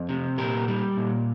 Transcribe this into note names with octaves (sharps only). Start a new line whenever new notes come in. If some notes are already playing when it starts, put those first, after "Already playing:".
Already playing: F2
C3
A#2 G4 A#4
G3
A#2